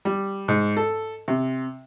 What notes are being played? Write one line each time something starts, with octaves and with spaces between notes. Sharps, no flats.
G3
G#2
A4
C3